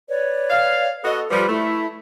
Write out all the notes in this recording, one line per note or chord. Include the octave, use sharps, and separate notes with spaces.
B4 C#5 D5
F5
B3 F#4 A4 D#5
F3 G3 F4 B4
A3 E4